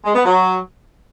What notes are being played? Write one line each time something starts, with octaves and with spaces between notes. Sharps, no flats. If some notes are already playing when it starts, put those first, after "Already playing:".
G#3
B3
F#3